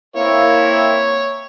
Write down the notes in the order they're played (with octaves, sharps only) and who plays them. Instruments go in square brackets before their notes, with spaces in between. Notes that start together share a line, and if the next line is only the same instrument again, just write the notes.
[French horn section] A#3 C4 E4 [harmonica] C#5